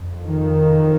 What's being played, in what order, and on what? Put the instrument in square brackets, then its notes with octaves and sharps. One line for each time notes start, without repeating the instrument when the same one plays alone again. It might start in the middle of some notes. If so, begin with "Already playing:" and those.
Already playing: [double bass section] F2
D#3